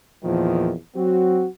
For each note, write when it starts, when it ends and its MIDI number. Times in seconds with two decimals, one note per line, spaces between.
0.24 0.73 40
0.24 0.73 46
0.24 0.73 51
0.24 0.73 53
0.96 1.47 54
0.96 1.47 60
0.96 1.47 66